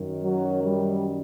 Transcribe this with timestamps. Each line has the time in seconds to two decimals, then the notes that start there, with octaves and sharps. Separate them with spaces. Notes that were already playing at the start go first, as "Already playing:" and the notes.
Already playing: F#2 D#3
0.22 F#3
0.63 G3